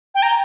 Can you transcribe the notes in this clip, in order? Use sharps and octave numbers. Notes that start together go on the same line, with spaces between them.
G5
A#5